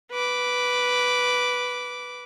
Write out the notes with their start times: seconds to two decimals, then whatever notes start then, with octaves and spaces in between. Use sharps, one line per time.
0.12 B4 D6